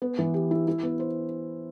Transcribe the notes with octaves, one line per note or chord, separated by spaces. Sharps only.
B3
E3
G4
E4
E4
B3
C5